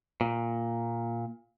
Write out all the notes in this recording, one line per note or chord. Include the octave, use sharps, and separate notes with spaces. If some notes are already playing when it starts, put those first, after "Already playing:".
A#2